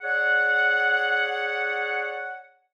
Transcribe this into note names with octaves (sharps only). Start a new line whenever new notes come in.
G#4 C#5 D5 F#5